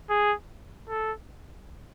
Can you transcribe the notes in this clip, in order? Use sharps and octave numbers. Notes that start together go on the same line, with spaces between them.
G#4
A4